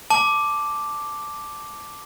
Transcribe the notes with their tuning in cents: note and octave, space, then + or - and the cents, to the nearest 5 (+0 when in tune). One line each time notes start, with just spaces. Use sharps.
A5 -5 D6 +0